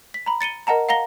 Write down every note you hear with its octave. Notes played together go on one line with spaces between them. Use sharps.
B6
A#5 B5
A6 C#7 D#7 G7
A#4 D#5 F#5 A5 A#5
F5 F#5 A#5 A#6 G7